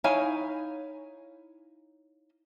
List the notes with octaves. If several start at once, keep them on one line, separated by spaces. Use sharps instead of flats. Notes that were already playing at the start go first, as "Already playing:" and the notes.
D#4 E4 C#5 F5 G#5